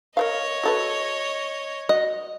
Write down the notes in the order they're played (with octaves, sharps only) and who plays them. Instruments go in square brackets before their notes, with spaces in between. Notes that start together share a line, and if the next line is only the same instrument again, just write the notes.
[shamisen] A#4 C5 F5 [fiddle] C#5 D#5
[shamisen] F#4 A4 B4
[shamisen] F#4 [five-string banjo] D#5